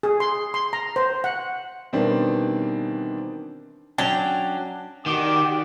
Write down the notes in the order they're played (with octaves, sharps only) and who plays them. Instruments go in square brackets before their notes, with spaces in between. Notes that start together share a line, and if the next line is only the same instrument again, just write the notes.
[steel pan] G#4
C6
C6
A#5
C5
F#5
[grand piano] B2 D#3 E3 G3 C4 D4
[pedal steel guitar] F#3 C#4 D4 [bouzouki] G5
[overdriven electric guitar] D#3 [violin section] F#4 G4 D5 [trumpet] D6